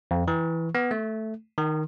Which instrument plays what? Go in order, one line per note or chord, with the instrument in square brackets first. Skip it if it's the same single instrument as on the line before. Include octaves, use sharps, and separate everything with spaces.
[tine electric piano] F2
E3
B3
A3
D#3